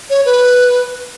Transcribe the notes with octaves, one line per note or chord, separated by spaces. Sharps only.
C#5
B4